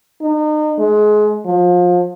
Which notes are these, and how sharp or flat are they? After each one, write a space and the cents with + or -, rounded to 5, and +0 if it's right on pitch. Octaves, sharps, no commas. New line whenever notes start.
D#4 -35
G#3 +25
F3 +30